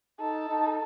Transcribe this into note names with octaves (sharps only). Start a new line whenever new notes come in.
D#4 A4
D#4